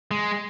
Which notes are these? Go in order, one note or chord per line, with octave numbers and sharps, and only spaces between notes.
G#3